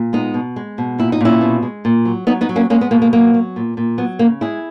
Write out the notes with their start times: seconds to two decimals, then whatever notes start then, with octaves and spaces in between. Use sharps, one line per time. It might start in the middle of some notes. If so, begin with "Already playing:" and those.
Already playing: A#2
0.13 G#3 B3 D#4
0.34 B2
0.56 G#3
0.78 B2
0.99 A#2 E4
1.12 D#4
1.21 A#2 C#4 E4
1.41 B2
1.63 G#3
1.85 A#2
2.05 F#3
2.27 F#3 B3 D#4
2.41 B3 D#4
2.49 F#3
2.56 A#3 C#4
2.70 G#3 A#3 C#4
2.81 B3
2.91 B2 A#3
3.02 A#3
3.13 F#3 A#3
3.34 F#3
3.56 A#2
3.77 A#2
3.98 F#3 B3
4.19 C#3 A#3
4.41 G#3 E4 G#4